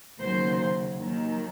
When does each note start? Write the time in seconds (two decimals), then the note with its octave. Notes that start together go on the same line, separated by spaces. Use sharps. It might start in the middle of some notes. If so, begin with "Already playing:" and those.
0.20 D#2 C#3 F#3 C5
0.98 D#2 D#3 F#3